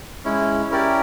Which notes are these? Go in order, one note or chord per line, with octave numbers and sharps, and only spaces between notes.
G#3 C#4 E4
C#4 E4 G4 A#4 D5